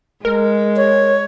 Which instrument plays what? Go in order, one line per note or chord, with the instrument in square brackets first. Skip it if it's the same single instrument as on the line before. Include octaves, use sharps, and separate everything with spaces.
[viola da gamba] G#3 [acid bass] A#4
[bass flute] C#5